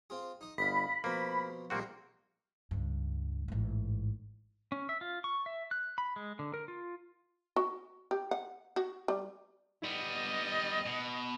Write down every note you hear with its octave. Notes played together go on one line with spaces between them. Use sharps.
C4 F4 G#4
D#4 D#6
G1 D#5 F5 B5
B2 F3 A#3 C4
A#1 G3 A#3 C4 F4 F#4
C#2 G2
A1 G#2
C#4
E5
F4
C#6
E5
F#6
B5
G#3
D3
A#4
F4
F#4
G4
F#5
F#4
G3
G3 B3 D#5
B2